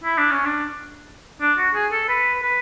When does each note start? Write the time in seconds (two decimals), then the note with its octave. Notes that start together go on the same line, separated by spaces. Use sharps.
0.04 E4
0.18 D4
0.31 C#4
0.45 D4
1.41 D4
1.57 F#4
1.74 G#4
1.91 A4
2.09 B4
2.42 B4